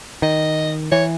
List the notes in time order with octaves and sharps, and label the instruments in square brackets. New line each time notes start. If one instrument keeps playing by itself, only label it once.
[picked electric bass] D#3 [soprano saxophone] D#5
[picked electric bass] E3 [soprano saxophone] C#5